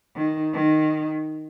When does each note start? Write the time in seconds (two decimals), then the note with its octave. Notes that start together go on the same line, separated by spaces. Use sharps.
0.16 D#3
0.54 D#3